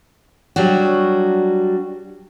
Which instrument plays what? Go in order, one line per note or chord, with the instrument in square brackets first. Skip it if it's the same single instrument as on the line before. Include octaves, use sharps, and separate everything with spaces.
[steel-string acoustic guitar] F#3 G3 D4 F#4